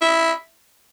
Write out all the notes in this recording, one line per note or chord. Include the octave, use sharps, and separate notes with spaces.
E4